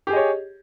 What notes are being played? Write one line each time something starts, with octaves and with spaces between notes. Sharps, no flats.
G4 G#4 C#5 D#5